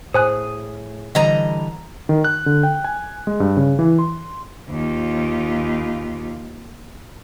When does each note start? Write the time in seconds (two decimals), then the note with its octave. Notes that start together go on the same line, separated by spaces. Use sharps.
0.14 A2 G#4 C5 G#5 D#6 F#6
1.15 D3 E3 G3 D#5 A#5
2.09 D#3
2.24 F#6
2.46 D3
2.63 G5
2.84 G#5
3.27 G#3
3.40 G2
3.57 C#3
3.79 E3
3.99 C6
4.70 D#2 F4